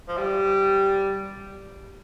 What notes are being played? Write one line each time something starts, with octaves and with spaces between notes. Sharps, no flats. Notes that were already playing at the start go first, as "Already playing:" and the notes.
F3
G3